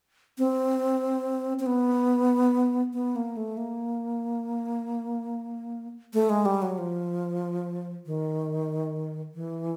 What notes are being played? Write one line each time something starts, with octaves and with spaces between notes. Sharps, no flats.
C4
C4
B3
B3
A#3
A3
A#3
A3
G#3
G3
F#3
F3
D#3
E3